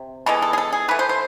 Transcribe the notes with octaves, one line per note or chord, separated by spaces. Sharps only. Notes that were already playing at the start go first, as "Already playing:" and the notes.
Already playing: C3
E3 G#3 B3 A4
A4
G#4
A4
G#4
E3 A3 B4
C5
C5